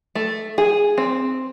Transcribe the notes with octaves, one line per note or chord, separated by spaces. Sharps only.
A3
G#4
C4